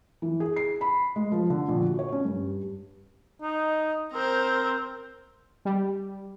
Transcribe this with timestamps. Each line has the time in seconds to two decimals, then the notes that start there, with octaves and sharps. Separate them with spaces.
0.22 E3
0.40 G#4
0.56 C7
0.81 B5
1.16 G#3
1.32 F3
1.50 D3
1.68 A#1
1.85 F#4
1.99 C#5
2.12 C#4
2.25 G2
3.42 D#4
4.13 C4 A#4 C5
5.65 G3